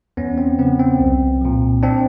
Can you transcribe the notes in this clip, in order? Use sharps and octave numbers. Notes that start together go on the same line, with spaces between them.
E2 B3 C#4
C4
C#3 F3 B3
C4
C2
A#2 F3
C4 D4